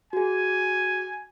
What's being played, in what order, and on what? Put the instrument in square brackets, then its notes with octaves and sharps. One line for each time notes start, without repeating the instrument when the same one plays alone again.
[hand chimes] F#4 G#4 [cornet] G#5